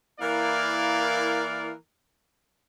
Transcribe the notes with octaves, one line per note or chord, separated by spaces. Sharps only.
E3 A#3 E4 A#4 D5 F5